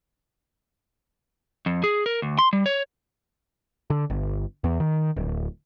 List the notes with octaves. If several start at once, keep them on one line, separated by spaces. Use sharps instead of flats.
F2
G#4
A#4
D2
C6
G3
C#5
D3
G1
E2
D#3
D1